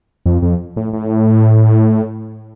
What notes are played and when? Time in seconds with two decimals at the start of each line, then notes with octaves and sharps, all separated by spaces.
0.26 F2
0.42 F2
0.76 A2
0.93 A2